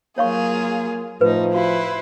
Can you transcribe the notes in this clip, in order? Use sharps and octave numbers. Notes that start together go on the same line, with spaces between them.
F#3 A#3 F4 G#4 C#5 F5 C#6
A2 F3 D#4 B4
E4 F#4 B4 C5 F5